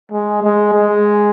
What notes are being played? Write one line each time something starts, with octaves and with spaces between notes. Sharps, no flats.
G#3
G#3
G#3